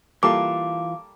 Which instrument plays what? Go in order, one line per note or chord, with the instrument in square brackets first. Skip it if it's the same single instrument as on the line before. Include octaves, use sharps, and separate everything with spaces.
[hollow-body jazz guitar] E3 F4 [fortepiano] G3 A#3 A4 [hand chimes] D6